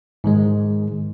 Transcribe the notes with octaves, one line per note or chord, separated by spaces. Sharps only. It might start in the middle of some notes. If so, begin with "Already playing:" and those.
G#2 D#3 G#3